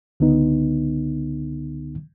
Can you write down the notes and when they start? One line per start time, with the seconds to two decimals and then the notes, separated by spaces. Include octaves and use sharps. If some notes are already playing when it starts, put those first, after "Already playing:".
0.20 C#2 D3 B3 D#4